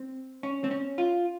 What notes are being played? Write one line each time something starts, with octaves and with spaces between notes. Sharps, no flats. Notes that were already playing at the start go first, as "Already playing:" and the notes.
Already playing: C4
C#4
C4
C#4
F4